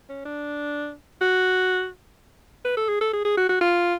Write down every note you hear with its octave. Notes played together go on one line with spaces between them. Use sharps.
C#4
D4
F#4
B4
A4
G#4
A4
G#4
G#4
F#4
F#4
F4